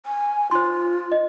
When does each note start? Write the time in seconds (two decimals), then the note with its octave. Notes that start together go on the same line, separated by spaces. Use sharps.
0.06 G#5
0.51 F4 C5 C6
1.12 D#5